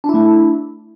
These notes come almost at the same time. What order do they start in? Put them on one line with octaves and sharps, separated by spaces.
D4 E4 A3